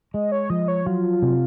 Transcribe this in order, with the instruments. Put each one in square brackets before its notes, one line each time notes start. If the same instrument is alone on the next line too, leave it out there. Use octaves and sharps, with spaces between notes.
[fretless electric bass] G#3 [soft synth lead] D#5
[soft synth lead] C#5
[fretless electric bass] F3 [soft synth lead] D#5
[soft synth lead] C#5
[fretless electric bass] F#3 [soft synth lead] F4
[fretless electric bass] C3